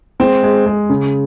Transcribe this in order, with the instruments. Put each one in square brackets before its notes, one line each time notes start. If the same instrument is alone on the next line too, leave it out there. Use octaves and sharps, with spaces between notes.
[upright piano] G#3 [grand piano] C4
[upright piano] G#3
G#3
C#3